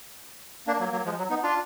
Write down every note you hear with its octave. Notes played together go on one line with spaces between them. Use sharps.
A#3 D4
F#3 A#3
F#3 A#3
F3 G#3
F#3
B3 D#4
D4 F4